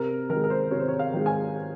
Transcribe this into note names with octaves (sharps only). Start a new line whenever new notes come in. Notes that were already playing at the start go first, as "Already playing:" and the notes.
Already playing: C3 A#4
D#3 G#3 A#4
A#4
C5
C3 C#5
C5
C#5
F5
D#3 G#3
G#5